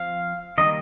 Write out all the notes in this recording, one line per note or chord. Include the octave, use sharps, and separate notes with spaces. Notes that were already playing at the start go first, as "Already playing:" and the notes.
Already playing: F3 C4 F5
D#3 G3 A#3 D#5